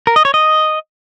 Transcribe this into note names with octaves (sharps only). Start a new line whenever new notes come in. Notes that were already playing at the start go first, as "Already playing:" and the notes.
A#4
D#5
C#5
D#5